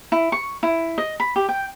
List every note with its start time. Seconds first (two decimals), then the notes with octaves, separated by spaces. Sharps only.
0.12 E4
0.32 C#6
0.63 E4
0.98 D#5
1.20 B5
1.36 G4
1.49 G5